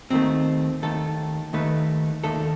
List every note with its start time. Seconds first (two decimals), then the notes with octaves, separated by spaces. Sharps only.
0.11 D#2 D#3 A3 C4
0.82 D#2 D#3 A3 A4
1.53 D#2 D#3 A3 B4
2.24 D#2 D#3 A3 A4